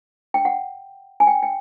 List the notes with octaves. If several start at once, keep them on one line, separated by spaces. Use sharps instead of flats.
G5
F#5
G#5
G5
G5